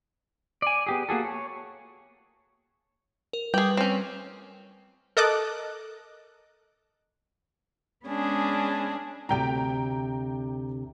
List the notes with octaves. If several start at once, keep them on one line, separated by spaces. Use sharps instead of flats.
D5 G#5
B3 G4 G#4
A#3 F#4 G#4 A4
C#5
A#4
G3 G#4 B4 G5
C4 C#4
A4 A#4 D#5 A5 D6 F#6
G#3 B3 C#4 D4 G#4
D2 C3 G5 A#5